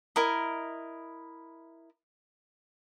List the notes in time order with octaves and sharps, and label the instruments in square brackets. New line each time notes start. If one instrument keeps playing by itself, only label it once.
[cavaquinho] E4 A#4 D#5